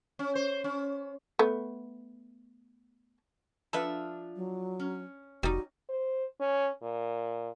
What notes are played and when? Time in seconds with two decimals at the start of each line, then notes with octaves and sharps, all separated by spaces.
0.19 C#4
0.35 C5
0.64 C#4
1.39 A3 B3
3.73 F3 D4 F4 A4 B4 E5
4.36 F#3
4.79 C#4
5.43 F1 G3 D#4 F#4
5.89 C5
6.40 C#4
6.83 A#2